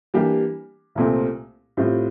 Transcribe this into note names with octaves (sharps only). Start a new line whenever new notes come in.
E3 G3 A#3 D4 G4
C2 A#2 A3 C4
A2 G3 C4 F4